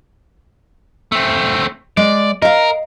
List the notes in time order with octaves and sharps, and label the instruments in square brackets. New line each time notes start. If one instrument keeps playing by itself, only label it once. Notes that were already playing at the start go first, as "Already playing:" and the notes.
[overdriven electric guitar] A3 C4
[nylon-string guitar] G#3 [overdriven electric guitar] D5
[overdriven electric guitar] A#4 [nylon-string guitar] D#5 F5